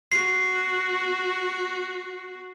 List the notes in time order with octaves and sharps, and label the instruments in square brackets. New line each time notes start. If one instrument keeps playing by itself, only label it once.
[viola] F#4 [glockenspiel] C7